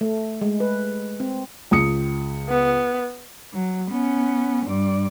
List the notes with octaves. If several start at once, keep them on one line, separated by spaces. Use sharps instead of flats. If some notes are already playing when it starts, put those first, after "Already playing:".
A3
G#3
B4
C4
C#2 D#6 C#7
B3
F#3
B3 C#4
G2 D5